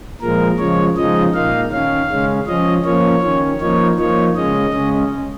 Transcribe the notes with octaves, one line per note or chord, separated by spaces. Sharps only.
A#2 F3 G#3 A#4
C#3 F3 G#3 C#5
C#3 F3 G#3 D#4 D#5
A#2 A#3 D#4 F5
D#3 C#4 F5
C#3 G#3 C#4
F3 C#4 D#5
F3 A#3 C#4 C#5
D#3 C#4
F3 A#3 D#4 C#5
F3 A#3 D#4 C#5
C#3 G#3 C#4 D#5
C#3 G#3 C#4